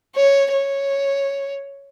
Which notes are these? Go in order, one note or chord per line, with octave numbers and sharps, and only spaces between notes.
C#5
C#5